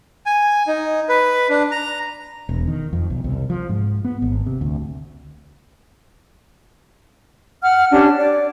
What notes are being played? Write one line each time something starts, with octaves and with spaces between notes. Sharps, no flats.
G#5
D#4
B4
D4
A#5
E1
D#3
F2
B1
C2
F3
G#2
B3
G#1
C3
D2
F#5 F6
C#4 D4 G4
D5